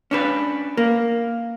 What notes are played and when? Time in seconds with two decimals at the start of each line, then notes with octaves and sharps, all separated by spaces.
0.11 C#4 D4 B4
0.77 A#3